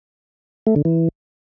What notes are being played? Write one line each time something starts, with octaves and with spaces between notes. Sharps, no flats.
A3
D3
E3